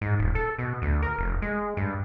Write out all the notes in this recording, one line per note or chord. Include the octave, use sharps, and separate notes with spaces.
G#2
D#1
A4
B2
D2
A#4
F1
G#3
G2